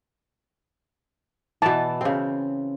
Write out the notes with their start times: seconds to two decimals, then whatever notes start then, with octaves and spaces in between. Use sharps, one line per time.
1.62 B2 E3 A5
2.01 C#3 C4